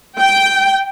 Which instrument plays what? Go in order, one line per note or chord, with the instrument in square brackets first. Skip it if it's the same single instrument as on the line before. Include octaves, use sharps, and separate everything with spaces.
[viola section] G5